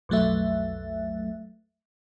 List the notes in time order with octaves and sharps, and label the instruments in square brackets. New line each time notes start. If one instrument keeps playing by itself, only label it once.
[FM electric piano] B1 F2 F#3 A3 E5